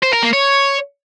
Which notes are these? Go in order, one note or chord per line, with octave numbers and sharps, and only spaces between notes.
C5
A#4
A#3
C#5